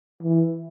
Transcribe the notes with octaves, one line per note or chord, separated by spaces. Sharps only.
E3